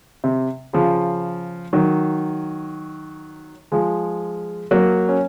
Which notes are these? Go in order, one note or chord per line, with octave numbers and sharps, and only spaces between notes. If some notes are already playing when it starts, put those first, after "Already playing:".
C3
C#3 F3
D#3 F#3
F3 G#3
F#3 A#3
C#4